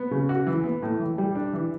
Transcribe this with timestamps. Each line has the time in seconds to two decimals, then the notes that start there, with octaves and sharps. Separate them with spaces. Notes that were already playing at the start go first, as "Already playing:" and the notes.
Already playing: B3
0.11 C#3
0.29 F#4
0.47 E3
0.64 B3
0.82 A2
1.00 E3
1.18 G3
1.35 D4
1.53 E3